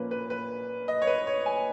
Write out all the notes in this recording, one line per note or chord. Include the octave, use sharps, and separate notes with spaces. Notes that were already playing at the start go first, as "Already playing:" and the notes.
Already playing: A#2 F3 A#3 C#4 B4
B4
B4
D#5
C#5
B4
C#5
G#5